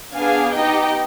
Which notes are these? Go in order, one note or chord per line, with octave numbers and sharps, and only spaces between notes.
B3 D4 G#4 F5 G#5
B3 D#4 G4 D#5 G5